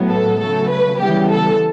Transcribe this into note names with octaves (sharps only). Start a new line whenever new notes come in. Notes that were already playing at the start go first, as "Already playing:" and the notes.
Already playing: A2 F#3 B3
A4
C#3 F#3 A3 A4
B4
C#3 E3 G3 B3 G4
A4